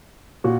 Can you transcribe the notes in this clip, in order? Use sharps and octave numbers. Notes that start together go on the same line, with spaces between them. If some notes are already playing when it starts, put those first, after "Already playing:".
A#2 F#4